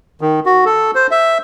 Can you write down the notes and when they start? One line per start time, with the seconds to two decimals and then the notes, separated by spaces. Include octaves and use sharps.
0.21 D#3
0.46 F#4
0.65 A4
0.95 C5
1.11 E5